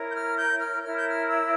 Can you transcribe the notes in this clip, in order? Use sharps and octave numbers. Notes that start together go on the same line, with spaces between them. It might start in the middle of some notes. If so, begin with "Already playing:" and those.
Already playing: E4 A#4 C#5
G6
F6
G6
F6
E4 A#4 C#5 F6
G6
F6
E6